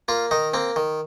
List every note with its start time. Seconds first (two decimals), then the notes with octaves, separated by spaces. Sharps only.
0.08 A#3 F4
0.31 D#3 D#4
0.54 A#3 C4
0.76 D#3